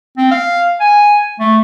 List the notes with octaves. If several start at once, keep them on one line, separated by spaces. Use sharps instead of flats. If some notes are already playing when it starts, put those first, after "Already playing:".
C4
F5
G#5
A3